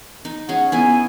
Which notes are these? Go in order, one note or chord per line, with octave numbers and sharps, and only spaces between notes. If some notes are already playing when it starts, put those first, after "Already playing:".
D#4
C#4 G#4 F#5
B3 E4 G#4 G#5